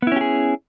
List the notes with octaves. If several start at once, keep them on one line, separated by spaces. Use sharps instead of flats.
B3 C#4 E4 G4 G#4